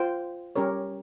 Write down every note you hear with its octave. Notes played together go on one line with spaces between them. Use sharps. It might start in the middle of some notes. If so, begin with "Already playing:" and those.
Already playing: F4 C5 G5
G3 C#4 G4 A#4 C#5